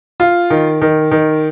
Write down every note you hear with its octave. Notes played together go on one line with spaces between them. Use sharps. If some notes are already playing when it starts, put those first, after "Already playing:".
F4
D#3
D#3
D#3